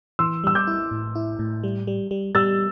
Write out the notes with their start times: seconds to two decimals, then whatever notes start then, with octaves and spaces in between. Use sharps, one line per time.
0.19 E3 C6 E6
0.44 G3 E6
0.55 D6 G6
0.67 E4
0.91 A2
1.15 E4
1.39 A2
1.63 G3
1.87 G3
2.11 G3
2.35 G3 E6 A6